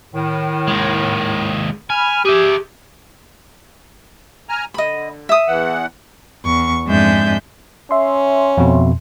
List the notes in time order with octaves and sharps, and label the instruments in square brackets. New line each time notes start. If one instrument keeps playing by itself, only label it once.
[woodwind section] A2 D#3
[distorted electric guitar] D#2 G#3
[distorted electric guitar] G#5 [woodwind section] B5 F6
[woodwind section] G4 [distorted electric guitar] G#4 E5
[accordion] G#5 A#5 F6
[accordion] D3 [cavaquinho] D#5 B5
[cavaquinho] E5 D#6
[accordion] E2 E3 F#5
[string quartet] E2 C#6
F2 G#2 G#3 D4 E5 G6
[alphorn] C#4 [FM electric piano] E5 C6
[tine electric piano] F2 B2